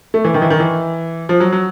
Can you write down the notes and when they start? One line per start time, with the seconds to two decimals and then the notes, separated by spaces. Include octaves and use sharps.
0.14 A3
0.24 E3
0.34 D#3
0.42 E3
0.50 D#3
0.60 E3
1.29 F3
1.40 F#3
1.53 F#3